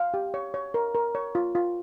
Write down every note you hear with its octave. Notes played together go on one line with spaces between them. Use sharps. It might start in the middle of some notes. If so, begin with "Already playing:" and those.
Already playing: F5
G4
C#5
C#5
A#4
A#4
C#5
F4
F4